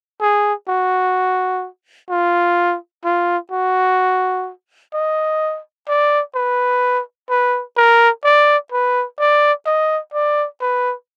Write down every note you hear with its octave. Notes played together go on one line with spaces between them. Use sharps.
G#4
F#4
F4
F4
F#4
D#5
D5
B4
B4
A#4
D5
B4
D5
D#5
D5
B4